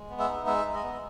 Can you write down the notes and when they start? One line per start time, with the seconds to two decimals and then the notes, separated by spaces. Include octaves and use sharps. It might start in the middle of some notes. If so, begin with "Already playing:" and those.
Already playing: G#3
0.10 B3
0.19 E5
0.28 D#4
0.47 G#3 E5
0.65 G#3
0.74 D#5
0.84 B3